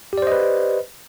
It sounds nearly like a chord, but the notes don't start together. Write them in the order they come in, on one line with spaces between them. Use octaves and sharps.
G4 D5 C5 D#5 B4